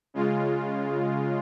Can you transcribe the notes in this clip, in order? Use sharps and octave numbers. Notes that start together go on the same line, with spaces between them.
C#3 G#3 F4